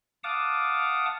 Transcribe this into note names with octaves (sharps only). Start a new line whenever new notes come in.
F5 F#5 A5 D6 D#6